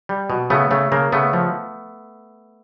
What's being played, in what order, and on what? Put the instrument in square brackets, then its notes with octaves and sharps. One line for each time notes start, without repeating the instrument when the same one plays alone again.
[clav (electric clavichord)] G3
B2
C#3 A3 B3
C#3 A3
C#3 A#3
C#3 A3 B3
F3